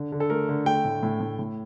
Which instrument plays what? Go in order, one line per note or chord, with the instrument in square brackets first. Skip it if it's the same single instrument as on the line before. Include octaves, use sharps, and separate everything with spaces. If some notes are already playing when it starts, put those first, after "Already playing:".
Already playing: [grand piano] D3
D3
A4
A3 A#4
D3
A3 G5
A2
A2
A2
A2